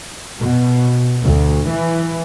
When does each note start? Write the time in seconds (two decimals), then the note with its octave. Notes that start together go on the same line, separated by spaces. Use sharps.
0.40 B2
1.23 D2
1.69 E3